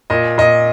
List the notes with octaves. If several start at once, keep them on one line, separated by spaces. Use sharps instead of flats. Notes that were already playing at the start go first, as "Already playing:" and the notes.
A#2 D#5
A#2 D#5